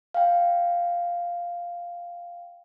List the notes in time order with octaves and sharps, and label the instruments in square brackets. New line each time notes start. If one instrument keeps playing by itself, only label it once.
[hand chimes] F5 G5